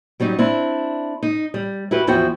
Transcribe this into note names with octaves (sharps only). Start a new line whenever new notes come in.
F#3 G3 C#4 D#4
C4 D4 E4
D#4
G3
E4 F#4 G4 B4
E2 F3 E4 F#4 G5